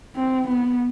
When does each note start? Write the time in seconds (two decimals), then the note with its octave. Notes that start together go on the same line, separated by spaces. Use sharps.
0.15 C4
0.48 B3